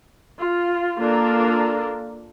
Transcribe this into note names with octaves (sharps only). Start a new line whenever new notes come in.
F4
A#3 D4 F4 A4 A#4